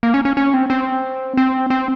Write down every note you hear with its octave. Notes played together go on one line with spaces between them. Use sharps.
A#3
C#4
C#4
C#4
C4
C4
C4
C4